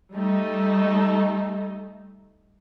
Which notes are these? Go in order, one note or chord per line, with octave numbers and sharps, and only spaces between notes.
G3 A3 D#4